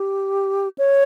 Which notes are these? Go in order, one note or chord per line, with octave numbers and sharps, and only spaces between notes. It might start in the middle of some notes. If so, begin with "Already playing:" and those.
Already playing: G4
C#5